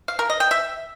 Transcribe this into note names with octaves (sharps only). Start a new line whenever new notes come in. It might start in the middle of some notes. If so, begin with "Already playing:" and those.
F5
A#4
D#5
G5
E5